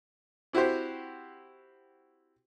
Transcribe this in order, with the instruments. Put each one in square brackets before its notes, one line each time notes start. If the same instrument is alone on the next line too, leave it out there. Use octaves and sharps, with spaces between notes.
[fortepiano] C4 E4 F#4 G4 C5